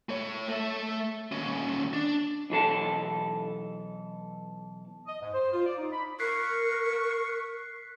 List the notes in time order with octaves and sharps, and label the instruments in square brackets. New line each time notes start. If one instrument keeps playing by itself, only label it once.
[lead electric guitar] A3 C#5
A3 E5
D#2 C#4
D4
[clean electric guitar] B1 E3 A4 A5
[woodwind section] D#5
G#2
C5
F4
D5
D#4
B5
[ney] A#4 [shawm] C#6 [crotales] F#6 B6 C7